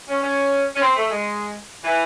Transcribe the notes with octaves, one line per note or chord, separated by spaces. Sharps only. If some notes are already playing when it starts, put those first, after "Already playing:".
C#4
C#4
C#4
C4
A3
G#3
E3